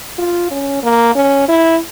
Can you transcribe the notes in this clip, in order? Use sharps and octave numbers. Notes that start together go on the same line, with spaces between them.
F4
C#4
A#3
C#4
E4